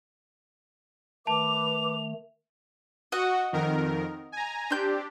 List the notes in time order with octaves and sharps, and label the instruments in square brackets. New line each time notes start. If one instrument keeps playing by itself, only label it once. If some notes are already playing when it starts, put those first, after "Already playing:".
[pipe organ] D#3 A3 [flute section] B4 D6 [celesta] A5 [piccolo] F7
[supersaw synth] F#4 [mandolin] D#5 F#5
[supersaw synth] F2 D#3 A#4
G#5 A#5
[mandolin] C4 G6 [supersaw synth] D4 G4